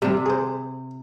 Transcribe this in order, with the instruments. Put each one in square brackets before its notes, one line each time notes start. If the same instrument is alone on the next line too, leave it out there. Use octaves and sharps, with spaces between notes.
[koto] C3 [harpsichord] G3 D4
[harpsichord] G#4 C5